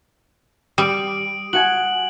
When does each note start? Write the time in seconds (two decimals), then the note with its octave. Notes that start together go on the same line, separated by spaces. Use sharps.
0.78 G3 D#6 D7
1.53 F#4 F#5 G#5 F#7